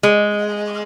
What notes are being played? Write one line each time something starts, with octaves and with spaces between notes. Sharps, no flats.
G#3